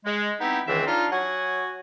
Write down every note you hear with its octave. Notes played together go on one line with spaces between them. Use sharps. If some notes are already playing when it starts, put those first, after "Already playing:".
G#3
B3 C4 D#4 E4 G4
C#2 D#3 E3 C4 E5
D4 D#4 F4 F5
F#3 F#4 F#5 G#5